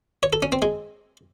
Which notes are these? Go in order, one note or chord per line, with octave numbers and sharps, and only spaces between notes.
C#5
A4
C#4
C4
G#3